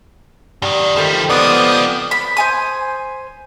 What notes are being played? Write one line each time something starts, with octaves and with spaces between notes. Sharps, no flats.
F#2 D#3 G3
D#3 F3 G3 A3 C5
C#2 F3 B3 C4 D#4 F4 D5 D#6
B5
C5 G#5 D#6